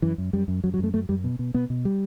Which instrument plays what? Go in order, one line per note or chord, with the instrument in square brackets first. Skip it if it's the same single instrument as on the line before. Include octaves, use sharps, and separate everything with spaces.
[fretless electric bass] F#2 E3
F#2
F#2 G3
F#2
F#2 F#3
F#3
F#2 A3
F#2 A3
F#2 G3
B2
B2
B2 B3
B2
G3